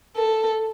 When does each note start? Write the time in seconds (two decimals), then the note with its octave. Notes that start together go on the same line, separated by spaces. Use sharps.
0.16 A4